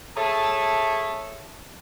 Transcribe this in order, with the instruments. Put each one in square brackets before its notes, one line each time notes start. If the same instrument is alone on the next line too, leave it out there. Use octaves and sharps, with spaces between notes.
[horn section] G#4 A4 C#5 E5 A5